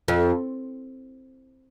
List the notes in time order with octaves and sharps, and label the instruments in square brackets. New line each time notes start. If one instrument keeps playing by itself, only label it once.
[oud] F2